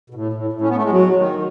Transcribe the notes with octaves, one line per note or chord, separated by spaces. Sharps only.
B2
A2
A2
A2
C#4
B3
A3
G#3
F#3
D#3